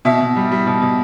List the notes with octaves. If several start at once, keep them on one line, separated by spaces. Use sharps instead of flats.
B2 E5
B2
G3
G3
B2
B2